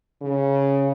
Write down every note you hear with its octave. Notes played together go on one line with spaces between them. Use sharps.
C#3